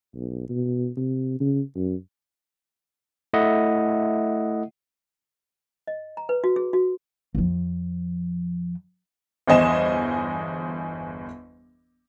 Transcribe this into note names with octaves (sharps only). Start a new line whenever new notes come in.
B1
B2
C3
C#3
F#2
A3 E4 D#5 E5 F#5
D#5
A#5
B4
F#4
G#4
F#4
F2 F3
G1 E2 C5 D#5 G#5 E7